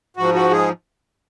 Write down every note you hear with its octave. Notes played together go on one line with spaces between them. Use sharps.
G#2 F3 F#4
F#4
G#3 G#4